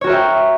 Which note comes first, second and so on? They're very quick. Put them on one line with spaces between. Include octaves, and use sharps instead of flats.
C#5 F#4 A#4 E5 G5